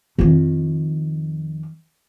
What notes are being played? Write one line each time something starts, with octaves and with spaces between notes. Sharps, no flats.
F2 D#3